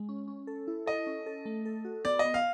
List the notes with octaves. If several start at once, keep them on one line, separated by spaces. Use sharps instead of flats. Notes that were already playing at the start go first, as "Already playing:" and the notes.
Already playing: G#3
C#4
C#4
A4
E4
A4 D#5
C#4
A4
A3
A4
F#4
B3 D5
D#5
B3
F5